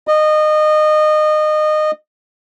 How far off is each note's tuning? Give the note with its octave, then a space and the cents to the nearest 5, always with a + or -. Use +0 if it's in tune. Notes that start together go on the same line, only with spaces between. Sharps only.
D#5 -25